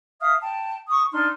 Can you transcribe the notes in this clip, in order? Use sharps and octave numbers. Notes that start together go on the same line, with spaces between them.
E5 F5 D#6 F6
G5 A5
C#6 D#6
D4 D#4 C6 F6